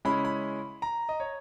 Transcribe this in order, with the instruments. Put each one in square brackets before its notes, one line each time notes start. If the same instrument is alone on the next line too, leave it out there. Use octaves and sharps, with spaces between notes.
[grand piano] C#3 G#3 C#4 E4 B5
B5
A#5
D#5
C#5